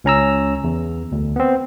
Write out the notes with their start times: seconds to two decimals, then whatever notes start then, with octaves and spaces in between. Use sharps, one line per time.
0.04 C#2 C#4 A#5 E6
0.64 E2
1.12 D2
1.36 B3 C4